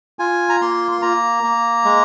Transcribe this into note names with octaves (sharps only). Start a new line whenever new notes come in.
F4 G#5
A#5
A#3 C6
C6
A#3 A#5
A#3
G#3